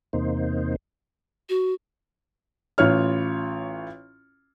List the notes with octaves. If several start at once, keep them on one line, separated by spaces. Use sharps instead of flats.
E2 C3 A#3 D#4 C5
F#4
A1 F4 C#5 F6